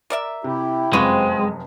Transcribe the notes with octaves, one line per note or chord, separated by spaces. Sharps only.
A#4 D5 E5
C3 E4 G4
F1 F#2 C3 G#3 C4 F4 F#4 B4